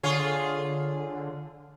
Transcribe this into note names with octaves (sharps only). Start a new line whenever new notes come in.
D3 F4 G#4 C#5